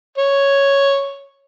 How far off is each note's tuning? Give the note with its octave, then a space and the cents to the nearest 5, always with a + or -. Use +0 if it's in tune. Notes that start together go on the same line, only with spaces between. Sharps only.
C#5 +0